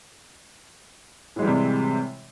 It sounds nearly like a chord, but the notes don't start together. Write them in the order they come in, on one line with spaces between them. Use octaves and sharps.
A2 G#3 E3 G3 C3